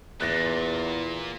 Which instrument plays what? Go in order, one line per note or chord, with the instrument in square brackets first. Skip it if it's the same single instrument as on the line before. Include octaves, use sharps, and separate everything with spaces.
[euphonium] E2 [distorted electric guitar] A#2 [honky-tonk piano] F#6 A6 A#6